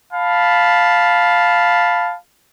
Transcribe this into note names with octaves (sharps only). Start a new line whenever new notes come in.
F5 A5 B5